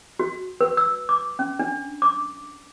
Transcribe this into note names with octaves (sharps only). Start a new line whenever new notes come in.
F#4
B4
E6
D6
C#4
D4
D6